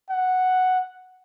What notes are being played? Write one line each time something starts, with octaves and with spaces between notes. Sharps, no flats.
F#5